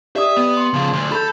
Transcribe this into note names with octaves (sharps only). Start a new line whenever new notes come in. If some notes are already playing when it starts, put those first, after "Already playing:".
G4 D5 E5 D#6
B3
C6
C#3 F3
D2
A4 B5 G6